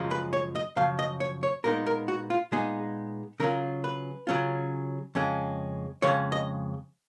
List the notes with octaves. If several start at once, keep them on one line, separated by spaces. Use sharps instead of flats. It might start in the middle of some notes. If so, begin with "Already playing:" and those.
Already playing: F#2 C#3 F3 G#3
B4
C#5
D#5
F#2 C#3 F3 F5
D#5
C#5
C#5
A#2 G#3 B3 D#4 A#4
A#4
F#4
F4
A#2 G#3 B3 D#4 G#4
C#3 F#3 C#4 F4 A#4
B4
C#3 F#3 C#4 F4
F2 C#3 G#3 C#4
F2 C#3 G#3 C#4 C#5
D#5